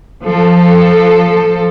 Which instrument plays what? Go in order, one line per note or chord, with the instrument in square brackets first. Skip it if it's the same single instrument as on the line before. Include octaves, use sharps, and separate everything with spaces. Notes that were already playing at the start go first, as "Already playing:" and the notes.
[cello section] F3 A4